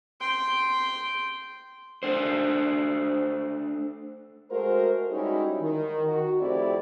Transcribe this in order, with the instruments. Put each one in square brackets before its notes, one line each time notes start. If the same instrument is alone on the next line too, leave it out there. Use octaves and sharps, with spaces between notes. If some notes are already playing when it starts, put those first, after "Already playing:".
[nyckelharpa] G5 C6
[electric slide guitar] A3 D4 C5
[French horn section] G#3 A3 F#4 A#4 C5
G3 G#3 C#4 D#4 E4 F#4
D#3
F#4
F2 A3 C4 E4 G4 D5